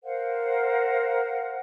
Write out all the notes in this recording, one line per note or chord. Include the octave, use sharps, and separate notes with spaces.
A#4 C5 F5 F#5